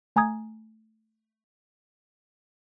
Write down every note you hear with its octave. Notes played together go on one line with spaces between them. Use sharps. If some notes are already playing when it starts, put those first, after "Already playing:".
A3 G#5 A#5 D#6 G#6